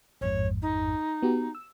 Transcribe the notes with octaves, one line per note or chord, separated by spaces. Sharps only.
A1 F2 G#2 C#5
D#4
B3 F#4 G4
E6